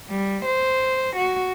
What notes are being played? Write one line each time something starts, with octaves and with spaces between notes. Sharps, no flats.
G3
C5
F#4